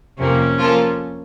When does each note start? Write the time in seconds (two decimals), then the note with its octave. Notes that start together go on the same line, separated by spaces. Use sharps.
0.19 F2 C3 F3 A#3 C#4
0.58 F3 A#3 F4 A4